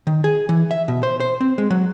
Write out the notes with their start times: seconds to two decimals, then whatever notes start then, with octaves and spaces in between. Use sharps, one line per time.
0.07 D#3
0.24 G#4
0.49 E3
0.71 E5
0.88 B2
1.03 C5
1.20 C5
1.41 C4
1.58 G#3
1.70 F#3